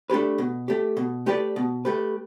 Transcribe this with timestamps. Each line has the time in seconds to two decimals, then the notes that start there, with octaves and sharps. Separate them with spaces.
0.10 A3 D4 G4 B4
0.38 B2
0.68 A3 G4
0.97 B2
1.26 A3 G4 B4 D5
1.56 B2
1.85 A3 G4 B4